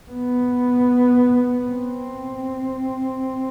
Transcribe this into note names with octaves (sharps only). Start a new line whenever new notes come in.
B3
C4